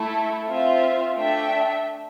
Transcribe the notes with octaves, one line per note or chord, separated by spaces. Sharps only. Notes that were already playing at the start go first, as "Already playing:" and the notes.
Already playing: A3 E4 A4
C4 F4 C5 E5
A3 D4 A4 E5 G5